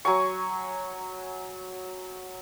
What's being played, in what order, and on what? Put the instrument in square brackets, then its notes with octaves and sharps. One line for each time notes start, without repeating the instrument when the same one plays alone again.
[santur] F#3 G#5 C#6